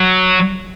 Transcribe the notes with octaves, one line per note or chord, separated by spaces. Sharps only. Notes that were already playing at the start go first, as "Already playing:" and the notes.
Already playing: F#3